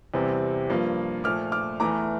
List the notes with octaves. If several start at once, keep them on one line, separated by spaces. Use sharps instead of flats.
E2 C3 G3 C4
G2 F3 A#3
A#2 F3 A3 D6 F6
D6 F6
E2 E3 A3 A#5 D6